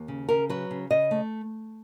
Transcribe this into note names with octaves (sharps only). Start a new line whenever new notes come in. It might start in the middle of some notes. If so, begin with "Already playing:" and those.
Already playing: D#2
C#3
C#3 A#4
F#3 B4
C#3
C#3 D#5
A3